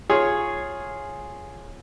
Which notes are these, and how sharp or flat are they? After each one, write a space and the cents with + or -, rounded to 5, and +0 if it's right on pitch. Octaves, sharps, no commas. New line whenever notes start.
F4 +0 G#4 +0 C#5 -5